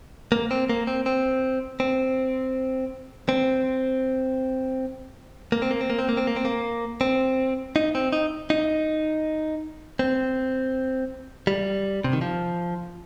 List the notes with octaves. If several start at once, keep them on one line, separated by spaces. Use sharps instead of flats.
A#3
C4
A#3
C4
C4
C4
C4
A#3
C4
A#3
C4
A#3
C4
A#3
C4
A#3
C4
A#3
C4
D#4
C4
D#4
D#4
C4
G3
C3
D#3
F3